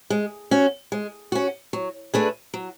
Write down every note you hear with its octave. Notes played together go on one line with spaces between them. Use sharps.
G#3
C#4 F#4
G#3
C#4 F#4
F#3
A3 D4 G#4 B4
F#3